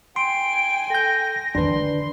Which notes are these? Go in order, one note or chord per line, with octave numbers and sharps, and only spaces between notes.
G5 G#5 C6 D7
A4 G6 A#6
D3 D#3 D4 B4 C6